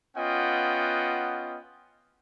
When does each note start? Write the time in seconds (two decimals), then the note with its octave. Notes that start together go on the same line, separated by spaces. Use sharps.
0.16 B3 C#4 F4 D#5 F#5 G5